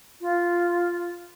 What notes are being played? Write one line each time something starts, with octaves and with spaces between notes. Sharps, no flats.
F4